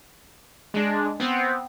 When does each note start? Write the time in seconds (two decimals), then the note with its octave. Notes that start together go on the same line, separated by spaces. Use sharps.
0.74 G#3 D4
1.20 B3 C4